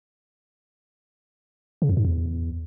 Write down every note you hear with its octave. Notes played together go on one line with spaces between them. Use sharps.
C#3
F2
G#2
E2